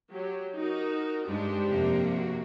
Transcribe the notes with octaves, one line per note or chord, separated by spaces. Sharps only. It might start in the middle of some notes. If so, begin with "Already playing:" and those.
F#3 G4
D#4 F#4 A#4
G2 G#3 D4 G4 C5
F2 C3 A#3
F#4